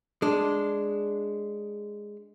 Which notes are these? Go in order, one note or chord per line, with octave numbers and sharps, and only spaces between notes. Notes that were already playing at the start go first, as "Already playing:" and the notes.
G#3 D4